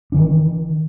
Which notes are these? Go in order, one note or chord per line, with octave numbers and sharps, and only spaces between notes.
D#3 E3 D4